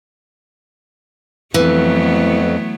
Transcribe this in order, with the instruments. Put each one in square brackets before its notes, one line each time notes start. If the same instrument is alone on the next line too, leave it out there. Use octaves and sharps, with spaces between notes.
[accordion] F2 [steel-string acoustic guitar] E3 [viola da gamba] F#3 A3 B3